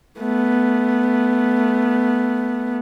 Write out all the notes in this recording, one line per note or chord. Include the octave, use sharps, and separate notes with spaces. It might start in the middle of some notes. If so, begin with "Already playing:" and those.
A3 B3